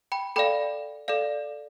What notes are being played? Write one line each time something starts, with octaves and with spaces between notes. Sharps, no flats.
G5 B5
A4 D5 F5 G5 B5
A4 D5 F5